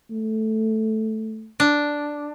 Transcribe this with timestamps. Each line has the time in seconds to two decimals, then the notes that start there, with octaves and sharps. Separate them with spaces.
0.11 A3
1.60 D4